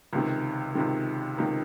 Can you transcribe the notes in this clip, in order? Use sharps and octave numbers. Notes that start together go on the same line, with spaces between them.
C#2 C3 D#3
C#2 C3 D#3
C#2 C3 D#3